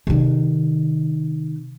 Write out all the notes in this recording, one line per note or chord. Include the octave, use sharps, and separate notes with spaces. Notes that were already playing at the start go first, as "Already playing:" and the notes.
C3 D#3